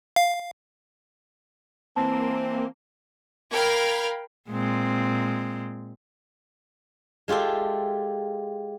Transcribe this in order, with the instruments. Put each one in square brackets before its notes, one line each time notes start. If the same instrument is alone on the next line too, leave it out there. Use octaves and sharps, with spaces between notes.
[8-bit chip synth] F5
[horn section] E3 C4 [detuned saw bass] A#3 [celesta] A5
[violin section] A#4 F5 G5 B5 F6 G#6
[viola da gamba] A#2 G#3 C4
[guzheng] G#3 F4 G4 A4 E5